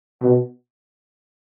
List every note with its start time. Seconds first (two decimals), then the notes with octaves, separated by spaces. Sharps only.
0.23 B2